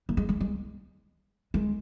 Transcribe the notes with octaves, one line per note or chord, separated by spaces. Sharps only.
A#3
G#3
G#3
G#3
G#3